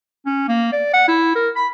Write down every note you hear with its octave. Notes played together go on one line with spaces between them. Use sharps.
C#4
A#3
D5
F#5
E4
A#4
B5